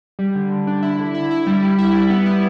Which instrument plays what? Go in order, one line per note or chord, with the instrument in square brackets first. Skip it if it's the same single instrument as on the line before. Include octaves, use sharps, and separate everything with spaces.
[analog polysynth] G3
D3
D3
D4
E4
D3
E4
E4
G3
G3
E4
G3
B3
E4